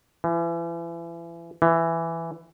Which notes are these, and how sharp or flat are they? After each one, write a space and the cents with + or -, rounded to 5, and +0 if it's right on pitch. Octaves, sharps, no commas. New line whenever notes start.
E3 +35
E3 +10